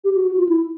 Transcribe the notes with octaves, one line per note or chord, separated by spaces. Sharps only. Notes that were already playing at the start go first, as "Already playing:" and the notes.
G4
F#4
F#4
F4
E4